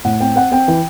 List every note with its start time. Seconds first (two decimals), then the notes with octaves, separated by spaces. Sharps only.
0.05 A2 F#5
0.20 C4 G5
0.36 C4 F#5
0.52 C4 G5
0.68 E3